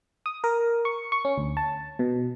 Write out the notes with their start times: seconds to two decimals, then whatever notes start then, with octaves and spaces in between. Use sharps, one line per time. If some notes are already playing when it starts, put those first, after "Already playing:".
0.26 D#6
0.44 A#4
0.85 C#6
1.12 C#6
1.25 C#4
1.38 D2
1.57 A5
1.99 B2